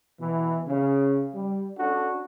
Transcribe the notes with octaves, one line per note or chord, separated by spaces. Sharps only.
B2 E3
C#3
G3
C#4 D4 F#4 A4